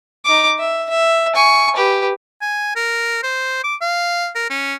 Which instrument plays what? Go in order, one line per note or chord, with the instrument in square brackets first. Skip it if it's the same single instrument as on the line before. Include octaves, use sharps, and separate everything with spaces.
[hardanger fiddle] D#4 D6
E5
E5
G#5 C#6
G4 B4
[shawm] G#5
A#4
C5
D6
F5
A#4
C#4